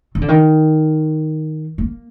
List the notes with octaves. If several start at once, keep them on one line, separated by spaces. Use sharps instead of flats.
D#3
D3
D#3
A#3